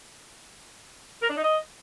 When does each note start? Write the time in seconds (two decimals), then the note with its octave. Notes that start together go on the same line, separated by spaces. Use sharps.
1.23 A#4
1.30 D4
1.37 D#4
1.44 D#5